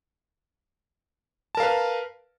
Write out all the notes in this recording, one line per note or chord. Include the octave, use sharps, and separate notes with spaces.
A#4 B4 F5 A5